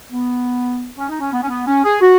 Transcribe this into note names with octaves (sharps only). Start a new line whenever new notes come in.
B3
C#4
D#4
C#4
B3
C#4
B3
C#4
G#4
F#4